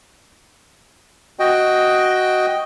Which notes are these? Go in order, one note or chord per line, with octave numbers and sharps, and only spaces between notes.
F#4 D#5 G5